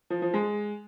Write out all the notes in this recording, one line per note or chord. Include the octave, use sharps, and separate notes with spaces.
F3
F3
G#3